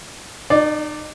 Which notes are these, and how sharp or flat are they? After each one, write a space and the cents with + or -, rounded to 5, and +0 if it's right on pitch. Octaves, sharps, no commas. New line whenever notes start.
D#4 -40 D5 +0